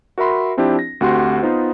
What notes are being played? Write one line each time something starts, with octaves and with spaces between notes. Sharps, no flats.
F#4 A#4 E5 B5 C6
F3 C4 D4 E4 G4
A#6
D2 C4 F#4 G4 F#5 C6
B3 D#4 F4 C5